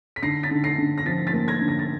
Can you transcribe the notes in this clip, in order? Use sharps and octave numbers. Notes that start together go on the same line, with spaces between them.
B6
D3 A#6 C7
A6 B6
D3
A#6 C7
D3
A#6
F3 A6 B6
A6 B6
A#3
G#6 A#6
D3
A#6
A6